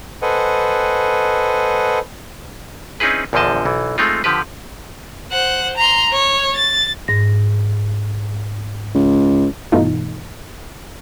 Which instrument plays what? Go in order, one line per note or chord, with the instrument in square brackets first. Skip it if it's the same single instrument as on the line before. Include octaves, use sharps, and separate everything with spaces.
[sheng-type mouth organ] A4 B4 C5 D#5 F#5 G#5
[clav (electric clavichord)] C4 C#4 D#4 E4 G#4 B4
A#1 E2 D3 F3 D#5 A5
B1 E3
G#3 A3 C4 D#4 F4
D3 F3 G4 B4
[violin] C5 F#5
A#5 C6
C#5
A6
[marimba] G#2 A#6
[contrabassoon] C#2
[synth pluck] G2 B2 E3 A3 D#4 F4